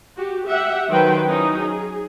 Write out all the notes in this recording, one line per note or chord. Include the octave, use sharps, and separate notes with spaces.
F#4 G4
G4 E5 F#5
D#3 F#3 B4 C5 G5
F#3 C#4 D#4 E4
G#4